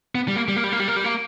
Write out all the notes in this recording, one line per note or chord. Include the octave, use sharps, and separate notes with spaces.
B3
G3
A#3
G3
A#3
G3
A#3
G3
A#3
G3
A#3